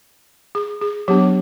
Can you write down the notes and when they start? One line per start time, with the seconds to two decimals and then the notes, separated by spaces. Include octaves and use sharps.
0.55 G#4
0.81 G#4
1.08 F#3 B3 D4 G4